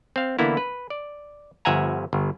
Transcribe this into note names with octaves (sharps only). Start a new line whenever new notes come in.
C4 F5
D3 E3 A#3 B3 E4
B4
D5
G1 F3 E5 F#5 G#5 A#5
G1